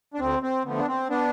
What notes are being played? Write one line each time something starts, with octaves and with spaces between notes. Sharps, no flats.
D4
D2 C4
C4
D3 F3 A3 B3
D4
C4
B3 D4